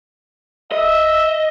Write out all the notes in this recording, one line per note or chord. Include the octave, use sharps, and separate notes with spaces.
D#5 E5